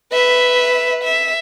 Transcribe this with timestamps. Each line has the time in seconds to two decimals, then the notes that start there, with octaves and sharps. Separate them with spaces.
0.12 B4 E5
1.03 E5